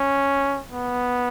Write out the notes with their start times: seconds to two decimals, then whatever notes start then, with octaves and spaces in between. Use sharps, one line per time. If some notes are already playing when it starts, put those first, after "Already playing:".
Already playing: C#4
0.72 B3